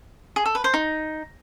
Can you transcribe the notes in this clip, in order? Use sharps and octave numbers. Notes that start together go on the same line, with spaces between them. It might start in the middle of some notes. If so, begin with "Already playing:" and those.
G#4
A4
B4
C5
D#4